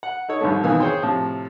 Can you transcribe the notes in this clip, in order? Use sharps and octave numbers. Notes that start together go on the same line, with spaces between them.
F#5
D#4 A4 C#5
C2 G#2 F3 A3
F2 B2 D#3 E3 G#5
G#4 C5 C#5 G5 C6
A2 C3 F3